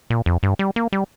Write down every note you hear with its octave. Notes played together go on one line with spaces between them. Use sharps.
A#2
F2
G2
G3
A#3
G3